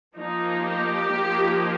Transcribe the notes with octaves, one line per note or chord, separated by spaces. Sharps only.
F3 A#3 D#4
G4
F3 A#3 D#4